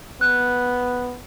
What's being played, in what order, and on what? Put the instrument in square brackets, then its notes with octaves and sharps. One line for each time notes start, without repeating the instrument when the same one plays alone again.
[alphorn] B3 [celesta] F#6